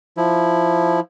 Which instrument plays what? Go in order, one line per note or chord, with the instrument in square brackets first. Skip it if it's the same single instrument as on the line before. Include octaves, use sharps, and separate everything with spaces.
[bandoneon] F3 E4